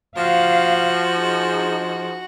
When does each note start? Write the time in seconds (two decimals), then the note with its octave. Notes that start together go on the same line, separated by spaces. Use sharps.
0.17 F3 F#4 F5
1.15 D#4 G#4